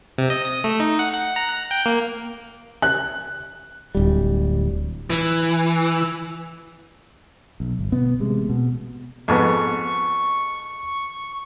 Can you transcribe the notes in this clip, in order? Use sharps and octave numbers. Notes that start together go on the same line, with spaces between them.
C3
D#5
D#6
A3
D#4
F#5
F#5
A#5
F#6
G5
A#3
F#6
D1 G3
E3
B1
G1
B2 B3
A1 C3 G#3
B2
F2 G#2 B3 C#6